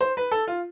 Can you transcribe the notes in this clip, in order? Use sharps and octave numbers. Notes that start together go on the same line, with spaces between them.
C5
B4
A4
F4